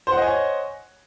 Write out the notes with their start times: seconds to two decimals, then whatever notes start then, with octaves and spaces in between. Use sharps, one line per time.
0.07 C5
0.12 F#5
0.17 D#5
0.22 G#5
0.27 C#5